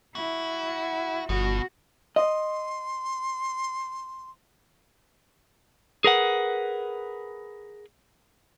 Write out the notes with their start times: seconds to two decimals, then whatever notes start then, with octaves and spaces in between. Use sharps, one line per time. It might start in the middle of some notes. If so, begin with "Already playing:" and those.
0.15 E4 F#4
1.29 G1 B2 F#4
2.16 D#5 C6
6.04 G#4 A#4 B4 F#5